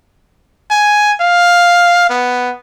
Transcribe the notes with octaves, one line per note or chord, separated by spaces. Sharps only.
G#5
F5
B3